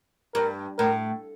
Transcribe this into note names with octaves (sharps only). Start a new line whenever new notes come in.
G2 A#4
A2 A#4